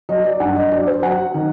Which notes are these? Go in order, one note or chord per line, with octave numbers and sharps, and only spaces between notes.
F#3 D#5
D5
G2 F#5
D#5
F#3 D5
C5
F#3 F#5
D#3